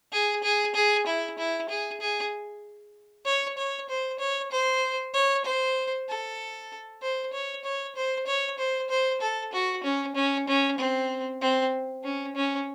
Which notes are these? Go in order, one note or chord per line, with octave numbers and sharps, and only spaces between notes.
G#4
G#4
G#4
E4
E4
G#4
G#4
C#5
C#5
C5
C#5
C5
C#5
C5
A4
C5
C#5
C#5
C5
C#5
C5
C5
A4
F#4
C#4
C#4
C#4
C4
C4
C#4
C#4